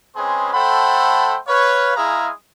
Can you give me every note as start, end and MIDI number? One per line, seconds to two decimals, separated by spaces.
0.16 0.54 56
0.16 0.54 60
0.16 0.54 61
0.16 0.54 68
0.16 0.54 71
0.16 0.54 84
0.54 1.37 57
0.54 1.37 69
0.54 1.37 72
0.54 1.37 78
0.54 1.37 79
0.54 1.37 83
1.47 1.92 71
1.47 1.92 73
1.47 1.92 77
1.96 2.30 56
1.96 2.30 64
1.96 2.30 68
1.96 2.30 77
1.96 2.30 80
1.96 2.30 82